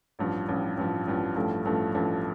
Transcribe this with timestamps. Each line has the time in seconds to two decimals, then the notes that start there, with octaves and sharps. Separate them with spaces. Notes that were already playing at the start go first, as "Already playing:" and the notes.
0.19 A1 G2 F3
0.48 A1 G2 F3
0.77 A1 G2 F3
1.07 A1 G2 F3
1.36 A1 G2 F3 A3
1.65 A1 G2 F3 A3
1.94 A1 G2 F3 A3